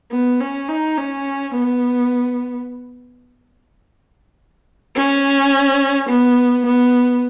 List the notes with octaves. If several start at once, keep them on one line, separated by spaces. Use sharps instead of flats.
B3
C#4
D#4
C#4
B3
C#4
B3
B3